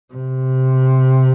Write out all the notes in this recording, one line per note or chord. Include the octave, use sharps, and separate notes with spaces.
C3